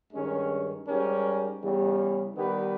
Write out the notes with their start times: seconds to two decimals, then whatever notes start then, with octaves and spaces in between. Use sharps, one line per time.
0.12 G2 D#3 G#3 C#4
0.87 G#2 G3 C#4 G4 A#4
1.61 E2 C#3 G3
2.36 D#3 G3 B3 G4 B4